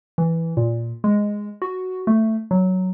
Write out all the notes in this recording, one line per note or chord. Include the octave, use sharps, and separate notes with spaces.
E3
A#2
G#3
F#4
A3
F#3